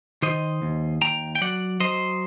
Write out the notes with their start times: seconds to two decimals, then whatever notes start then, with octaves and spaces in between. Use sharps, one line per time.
0.22 D#3 C5 D#5
0.62 D#2
1.02 D#2 G5 A#5
1.35 G5
1.41 F#3 D5 F#5
1.80 F#3 C5 D#5